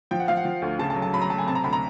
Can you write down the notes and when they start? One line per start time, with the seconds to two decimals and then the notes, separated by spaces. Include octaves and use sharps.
0.11 F3 G5
0.20 F#5
0.28 F3 F5
0.37 F#5
0.45 F3
0.62 D2
0.79 C#3 A5
0.90 A5
0.96 F#3
1.02 A5
1.13 F#3 B5
1.22 A#5
1.30 F#3 A5
1.38 G#5
1.47 C3 A5
1.55 A#5
1.64 D2 B5
1.73 A#5